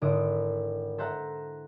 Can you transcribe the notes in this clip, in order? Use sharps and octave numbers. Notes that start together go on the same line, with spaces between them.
G#1 D3 E4 D#6 D7
A4 C5 E5 F#5 A5 A#5